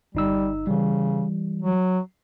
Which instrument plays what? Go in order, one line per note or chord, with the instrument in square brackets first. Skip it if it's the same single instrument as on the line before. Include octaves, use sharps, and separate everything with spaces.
[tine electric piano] G1 D#4 E6 [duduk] G3
[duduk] C#3 [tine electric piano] E3 G3
[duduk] F#3